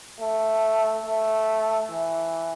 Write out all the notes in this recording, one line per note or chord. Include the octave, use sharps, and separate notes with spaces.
A3
A3
E3